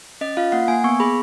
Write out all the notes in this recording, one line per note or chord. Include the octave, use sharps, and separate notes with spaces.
C#4 D#5
F4 F5
A#3 F#5
A#3 G#5
B3 C#6
G#4 B5